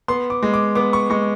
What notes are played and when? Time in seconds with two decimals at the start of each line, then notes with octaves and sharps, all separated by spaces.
0.08 B3 C6
0.30 D6
0.43 G#3
0.54 D6
0.75 B3 D6
0.93 C#6
1.10 G#3 C#6